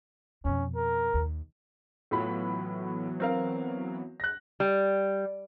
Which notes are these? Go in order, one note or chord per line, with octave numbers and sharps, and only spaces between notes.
F2 B2 C#4
A#4
D#2
A2 E3 F#3 B3 F4 B5
C4 A#4 F5
F#6 A#6
G3